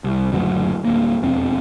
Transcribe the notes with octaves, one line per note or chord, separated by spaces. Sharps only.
C2
F#1 D2 A#2 F#3
D1 A#3
E1 F2 C4